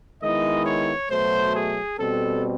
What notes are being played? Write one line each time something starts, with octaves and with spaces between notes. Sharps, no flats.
D#3 G#3 B3 E4 D#5
C#5
B2 F#3 A3 C5
G#4
B2 G3 C4 A4